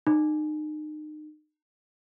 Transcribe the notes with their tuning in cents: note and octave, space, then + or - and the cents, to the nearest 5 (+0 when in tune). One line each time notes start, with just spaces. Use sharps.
D#4 -35